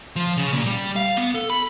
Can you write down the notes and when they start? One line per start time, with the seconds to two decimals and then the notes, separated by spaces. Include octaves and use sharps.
0.16 F3
0.37 C#3
0.53 A#2
0.66 G3
0.96 F5
1.17 B3
1.35 A4
1.50 B5